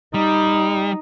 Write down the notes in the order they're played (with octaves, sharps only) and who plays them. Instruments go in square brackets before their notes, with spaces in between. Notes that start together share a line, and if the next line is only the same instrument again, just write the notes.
[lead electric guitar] G3 [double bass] D#4